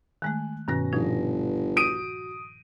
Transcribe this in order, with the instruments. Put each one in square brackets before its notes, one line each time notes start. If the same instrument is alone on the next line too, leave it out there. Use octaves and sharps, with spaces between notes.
[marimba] D#3 G#3 A3 [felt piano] G#5 F#6
[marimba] G2 D#3 F#6 [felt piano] B2 C#4 A#6
[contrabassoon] G1 [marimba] A#2 F3 D#4
[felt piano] F#4 [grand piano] D#6 D7 D#7